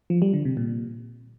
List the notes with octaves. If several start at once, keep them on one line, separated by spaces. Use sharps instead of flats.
F3
G3
D3
C3
A#2